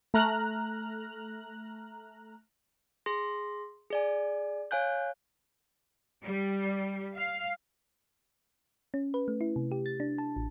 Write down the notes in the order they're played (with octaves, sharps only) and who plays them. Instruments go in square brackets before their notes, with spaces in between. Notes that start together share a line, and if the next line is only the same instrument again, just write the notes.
[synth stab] A3 A#5 F6 F#6
[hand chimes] G#4 C6 A#6
G#4 D5 G#5
C#5 F5 G#5 F#6 G6
[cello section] G3
F5
[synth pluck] C#4
B4
A3
E4
C3
G4
A6
D4
A5
A1